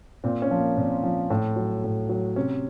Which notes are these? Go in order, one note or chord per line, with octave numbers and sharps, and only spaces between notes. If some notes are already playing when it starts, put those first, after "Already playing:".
A#2 C4
C#4
F3
A#3
A#2 C4
F3
A2
F#3
A2
F#3
C3 C#4